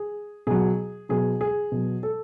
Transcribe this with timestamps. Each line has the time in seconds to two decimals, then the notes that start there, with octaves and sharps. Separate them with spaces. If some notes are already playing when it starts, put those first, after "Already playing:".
Already playing: G#4
0.47 B2 F#3 G#4
1.09 B2 F#3 G#4
1.41 G#4
1.72 B2 F#3
2.03 A4